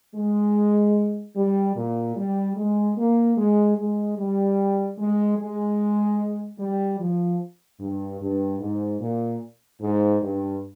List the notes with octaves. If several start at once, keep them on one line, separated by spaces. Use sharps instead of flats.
G#3
G3
A#2
G3
G#3
A#3
G#3
G#3
G3
G#3
G#3
G3
F3
G2
G2
G#2
A#2
G#2
G2